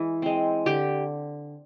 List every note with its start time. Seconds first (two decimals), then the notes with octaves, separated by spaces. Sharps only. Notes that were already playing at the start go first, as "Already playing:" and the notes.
Already playing: E3 G#3
0.22 G#3 C4
0.66 D3 G4